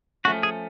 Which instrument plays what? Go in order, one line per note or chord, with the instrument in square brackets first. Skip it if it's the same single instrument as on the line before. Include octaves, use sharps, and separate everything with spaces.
[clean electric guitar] F3 A3 C#4 [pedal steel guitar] F#4
[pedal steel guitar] G#4